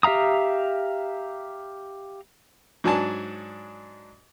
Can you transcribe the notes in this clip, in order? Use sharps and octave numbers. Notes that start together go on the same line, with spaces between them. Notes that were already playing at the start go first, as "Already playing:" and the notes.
G4 E5 F5 A#5 D#6
G#2 F#3 D4 G#5 A5